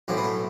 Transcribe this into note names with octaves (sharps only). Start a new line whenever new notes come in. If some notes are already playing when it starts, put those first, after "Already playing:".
B1 A2 E3 C4
B3
A3